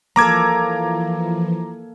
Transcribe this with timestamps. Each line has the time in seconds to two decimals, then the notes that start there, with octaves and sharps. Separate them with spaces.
0.16 E3 F3 A#3 A4 A#5 D6 G#6